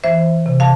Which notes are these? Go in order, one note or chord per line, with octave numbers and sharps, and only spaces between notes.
E3 C5 E5
C3
F5 A5